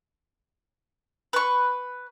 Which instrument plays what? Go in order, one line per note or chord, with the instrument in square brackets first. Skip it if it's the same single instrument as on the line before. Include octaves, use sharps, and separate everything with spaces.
[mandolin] B4 C#6